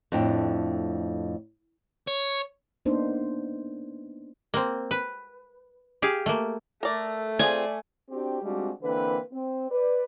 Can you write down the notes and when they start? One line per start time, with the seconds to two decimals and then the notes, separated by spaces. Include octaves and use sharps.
0.12 F2 A2 D4 G5
2.07 C#5
2.85 A#3 B3 D4 D#4 C5
4.54 A#3 C4
4.91 B4
6.02 G4 G#4 F5
6.26 A3 A#3
6.83 A3 A4 A#4 D5
7.39 C4 F4 G#4 D5 G#5
8.10 C4 D4 F#4 G4
8.43 G3 G#3 C4 D4 F4 F#4
8.82 D3 E3 A#3 C4 B4
9.32 C4
9.70 B4 D5